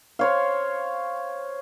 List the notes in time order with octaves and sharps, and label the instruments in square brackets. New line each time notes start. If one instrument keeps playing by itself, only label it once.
[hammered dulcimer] C5 C#5 F5